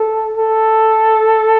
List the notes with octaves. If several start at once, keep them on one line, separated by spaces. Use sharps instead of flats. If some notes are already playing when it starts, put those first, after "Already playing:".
Already playing: A4
A4